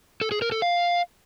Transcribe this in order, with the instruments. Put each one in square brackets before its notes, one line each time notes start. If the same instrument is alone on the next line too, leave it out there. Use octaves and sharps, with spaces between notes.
[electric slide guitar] A4
G#4
A#4
A4
F5